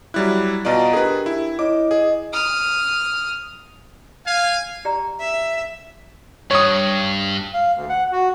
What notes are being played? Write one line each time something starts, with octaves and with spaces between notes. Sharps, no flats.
F#3 G3 E4 B5 D6 F#6
B2 F4 D5 D#5 A#5
D4 G4 G#4 A#4 B4
E4
E4 C#5 D#5 D6
G#4 D#5
D#6 F6
F5 G#5
G4 D5 A#5
E5
G2 C#5 D#6
F5
D2
F#5
F#4